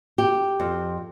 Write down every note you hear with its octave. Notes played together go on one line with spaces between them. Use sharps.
G4
F2